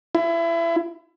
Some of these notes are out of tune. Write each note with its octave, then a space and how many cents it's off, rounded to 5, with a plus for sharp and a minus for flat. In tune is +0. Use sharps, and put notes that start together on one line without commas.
E4 +30